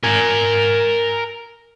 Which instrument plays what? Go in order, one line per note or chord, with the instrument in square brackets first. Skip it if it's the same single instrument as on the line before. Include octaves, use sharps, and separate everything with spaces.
[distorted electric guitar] A#4 G#5